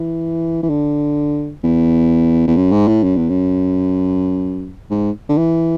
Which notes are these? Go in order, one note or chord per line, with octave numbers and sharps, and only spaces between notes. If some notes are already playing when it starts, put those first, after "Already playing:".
Already playing: E3
E3
D3
E2
E2
F#2
G#2
A2
F#2
E2
F#2
G#2
D3
E3